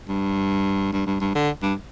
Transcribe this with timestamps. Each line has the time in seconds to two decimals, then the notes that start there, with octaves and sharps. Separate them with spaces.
0.08 G2
0.92 G2
1.06 G2
1.21 G2
1.35 D3
1.62 G2